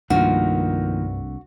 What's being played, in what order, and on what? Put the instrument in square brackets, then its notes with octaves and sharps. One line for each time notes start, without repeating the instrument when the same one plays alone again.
[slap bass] C2 A3 D4 [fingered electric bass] G2 [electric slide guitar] D#3 F3 A#3 [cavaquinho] F#4